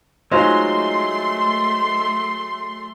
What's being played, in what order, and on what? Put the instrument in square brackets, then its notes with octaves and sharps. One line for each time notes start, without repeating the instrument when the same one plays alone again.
[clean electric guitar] F#3 G#3 [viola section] A3 C6 [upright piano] D#4 F4 C5